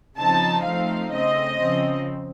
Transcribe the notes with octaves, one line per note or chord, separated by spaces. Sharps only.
C#3 F3 C4 D#4 A5
F3 A3 C4 D#4 F5
C#3 A3 C4 D#5
C#3 F3 C4